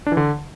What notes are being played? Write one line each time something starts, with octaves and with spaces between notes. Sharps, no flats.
D4
E3
D3